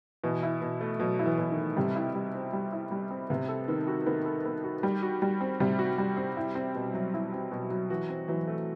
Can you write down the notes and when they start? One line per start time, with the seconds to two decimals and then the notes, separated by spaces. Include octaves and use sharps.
0.23 B2 E3
0.43 E4
0.62 B2
0.81 A3
0.99 B2 F#3
1.19 E4
1.26 E3
1.38 B2
1.51 D#3
1.57 A3
1.77 C3 G3
1.96 E4
2.15 G3
2.34 C4
2.53 G3
2.72 E4
2.91 G3
3.10 C4
3.30 C3 B3
3.49 A4
3.68 D#3 B3
3.87 F#4
4.06 D#3 B3
4.25 A4
4.45 B3
4.64 F#4
4.83 G3
5.02 F#4
5.22 G3
5.41 C4
5.60 C3 G3
5.79 F#4
5.98 G3
6.17 C4
6.37 E4
6.55 C4
6.75 B2
6.94 F#3
7.14 E4
7.33 C4
7.51 B2
7.70 F#3
7.90 E3 F#4
8.09 C4
8.28 E3 F#3
8.47 A3